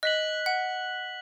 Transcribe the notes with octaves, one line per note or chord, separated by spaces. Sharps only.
D#5 F#6 B6 F#7
F#5